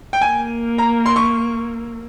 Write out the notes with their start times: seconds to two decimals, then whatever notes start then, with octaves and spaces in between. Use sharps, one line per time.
0.13 G5
0.21 A#3 G#5
0.78 A#5
1.06 C6
1.16 C#6